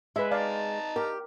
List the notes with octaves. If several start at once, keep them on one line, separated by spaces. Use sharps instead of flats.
G#3 B4 E5
D#4 D5 F5 A5 A#5
G4 A#4